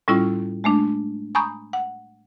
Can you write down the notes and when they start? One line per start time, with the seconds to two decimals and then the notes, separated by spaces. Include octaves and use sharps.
0.08 A2 G3 C#4 E4 F4 C#6
0.64 G#3 A3 D4
1.35 G#5 A#5 B5 C#6 D#6 G6
1.73 F#5